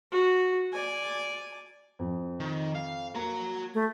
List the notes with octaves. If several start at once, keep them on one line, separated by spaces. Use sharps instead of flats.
F#4
D5 G#5
F2
D#3
F5
A#3 F#4 A#5
A3